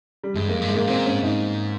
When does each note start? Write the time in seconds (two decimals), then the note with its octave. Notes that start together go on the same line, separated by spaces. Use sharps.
0.24 G3
0.35 G2 G#3
0.48 F2 A#3
0.61 G2
0.68 G#3
0.75 G#2 A#3
0.87 A#2 C4
1.06 G#2 C#4
1.23 G#2 D#4